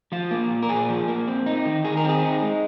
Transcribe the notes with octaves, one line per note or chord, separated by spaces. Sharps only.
F3 F4
A#3
A#2
A#4
A#2 G#4
F3
A#3
C4
D#4
D#3
D#3 G#4
A#4
C4
G#4
D#4
G#3